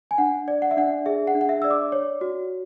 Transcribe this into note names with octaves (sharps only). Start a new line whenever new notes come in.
G#5
D4 F#5
D5
F#5
E5
D4 F#5
G#4 E5
F#5
D4
F#5
E5
D5 E6
D6
C#5
F#4